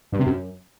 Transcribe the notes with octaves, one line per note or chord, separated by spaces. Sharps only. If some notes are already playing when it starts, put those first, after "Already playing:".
G2
C3
F#2